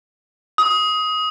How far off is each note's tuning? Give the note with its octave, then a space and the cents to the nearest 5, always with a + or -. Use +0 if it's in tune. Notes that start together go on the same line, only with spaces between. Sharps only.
D#6 +20